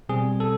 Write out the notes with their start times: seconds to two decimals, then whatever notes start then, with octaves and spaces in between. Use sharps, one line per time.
0.09 B2 G3 C4 G#4
0.40 A4